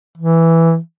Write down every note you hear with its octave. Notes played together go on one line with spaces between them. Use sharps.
E3